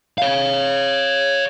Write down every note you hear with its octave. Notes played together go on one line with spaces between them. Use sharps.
C#5 F5